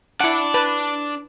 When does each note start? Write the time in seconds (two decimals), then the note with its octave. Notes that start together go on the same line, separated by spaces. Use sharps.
0.20 D4 E4 D5 F#5
0.54 B4 A5